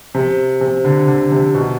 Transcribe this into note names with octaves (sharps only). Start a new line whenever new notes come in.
C3
C3
D3
D3
C3
B2